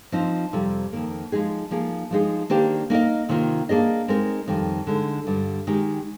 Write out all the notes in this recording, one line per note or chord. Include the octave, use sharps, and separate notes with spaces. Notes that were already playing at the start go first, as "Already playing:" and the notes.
F3 C4 D#4
F2 C3 G3
F2 D#3 A#3
F3 G#3 D#4 G#4
F3 A#3 D#4 G#4
F3 G#3 D#4 G#4
D#3 A#3 D4 G4 C5
A#3 D#4 A#4 D#5
C3 D#3 A#3 F4
A#3 D4 G#4 D#5
G#3 C4 D#4 A#4
F2 D#3 G3
D3 G#3 D#4
G2 D3 G3
D#3 G#3 D#4 G4 A#4